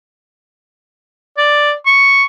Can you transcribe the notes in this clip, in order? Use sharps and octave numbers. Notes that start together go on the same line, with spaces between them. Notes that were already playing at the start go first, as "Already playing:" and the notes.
D5
C#6